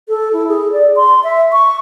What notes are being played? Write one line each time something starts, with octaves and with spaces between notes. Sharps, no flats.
A4
E4
G#4
D5
C6
E5
C#6